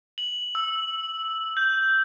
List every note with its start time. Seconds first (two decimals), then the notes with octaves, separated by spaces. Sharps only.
0.18 F#7
0.55 E6
1.57 G6